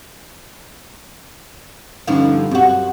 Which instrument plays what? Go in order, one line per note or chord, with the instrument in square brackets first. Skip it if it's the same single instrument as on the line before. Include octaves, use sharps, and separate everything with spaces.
[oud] G2 D3 F3 [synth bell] C#4 D#4 F5
[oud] F#2 F#4 [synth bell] C4 G4